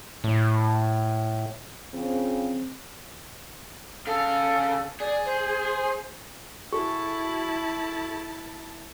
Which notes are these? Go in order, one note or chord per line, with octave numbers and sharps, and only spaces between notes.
A2
C#3 F3 C4
C#3 A4 F5
G#4 D5
C5
E4 F#4 G#4 A4 A5 C#6